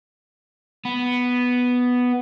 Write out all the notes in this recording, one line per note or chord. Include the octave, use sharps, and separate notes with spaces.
B3